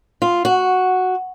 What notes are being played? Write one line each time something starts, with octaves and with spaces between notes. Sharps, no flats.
F4
F#4